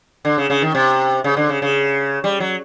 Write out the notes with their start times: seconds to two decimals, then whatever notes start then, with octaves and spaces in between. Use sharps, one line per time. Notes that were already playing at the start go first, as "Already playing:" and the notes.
0.25 D3
0.38 C#3
0.50 C#3
0.62 D#3
0.75 C3
1.24 C#3
1.36 D3
1.49 C#3
1.62 C#3
2.24 G3
2.40 F#3